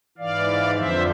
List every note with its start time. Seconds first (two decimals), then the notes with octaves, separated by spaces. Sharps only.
0.18 G#2 E3 D5 F5
0.76 F2 D3 F3 C5 E5